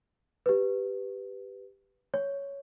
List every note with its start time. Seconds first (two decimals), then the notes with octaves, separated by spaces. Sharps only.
0.46 G4 B4
2.14 C#5